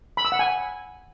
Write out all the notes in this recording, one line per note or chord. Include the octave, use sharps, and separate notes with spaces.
B5
E6
F#5
G#5